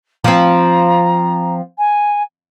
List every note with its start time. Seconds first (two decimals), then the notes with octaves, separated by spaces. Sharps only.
0.24 F3 C4 A#5
1.78 G#5